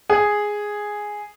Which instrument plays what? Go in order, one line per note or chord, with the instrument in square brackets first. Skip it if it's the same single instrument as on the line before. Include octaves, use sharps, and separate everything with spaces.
[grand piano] G#4